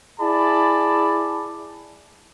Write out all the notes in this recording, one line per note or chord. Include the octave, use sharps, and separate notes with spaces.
E4 G#4 D5 A5 B5